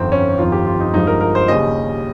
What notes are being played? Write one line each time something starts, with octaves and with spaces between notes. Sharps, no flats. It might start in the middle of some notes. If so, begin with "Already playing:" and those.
Already playing: G1 F2 D#3 C4
C#4
G1 F2 D#3 F4
G4
F4
D#4
G1 G2 F3 G#3 D#4
A#4
A#4
C5
D#2 C#3 G3 D#5